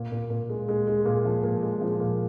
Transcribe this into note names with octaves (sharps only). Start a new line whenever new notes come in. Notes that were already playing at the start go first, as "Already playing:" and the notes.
Already playing: A#2
A#2
A#2
G#3
G#3
G#3
A#2
F3
A#2
G#3
F3
A#2